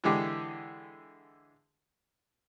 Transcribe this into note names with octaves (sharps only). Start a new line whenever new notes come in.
D3 E3 G#3 G4